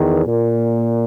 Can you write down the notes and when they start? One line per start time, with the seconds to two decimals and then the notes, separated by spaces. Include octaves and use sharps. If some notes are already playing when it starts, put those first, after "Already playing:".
Already playing: E2 D#3
0.26 A#2